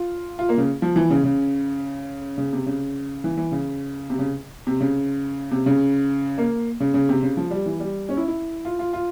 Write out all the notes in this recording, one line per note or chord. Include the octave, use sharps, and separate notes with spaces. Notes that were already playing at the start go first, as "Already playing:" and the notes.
Already playing: F4
F4
A#3
C#3
F3
E3
C#3
C#3
C#3
C3
C#3
E3
E3
C#3
C3
C#3
C3
C#3
C3
C#3
A#3
C#3
C#3
C3
C#3
F3
G3
E3
G3
C#4
E4
E4
F4
F4
F4